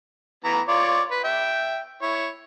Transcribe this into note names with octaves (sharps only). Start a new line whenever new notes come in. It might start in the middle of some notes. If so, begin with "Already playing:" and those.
E3 B3 A#5
F4 C#5 D5
B4
E5 G5
E4 C#5